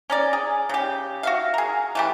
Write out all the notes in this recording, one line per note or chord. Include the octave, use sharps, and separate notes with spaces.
C#4 A#4 D5
G#4
C#3 G4
F#4 E5 F5
G#4 A#4
E3 A3 G4